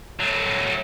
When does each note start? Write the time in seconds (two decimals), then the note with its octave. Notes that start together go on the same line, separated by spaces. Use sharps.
0.20 F#3 A3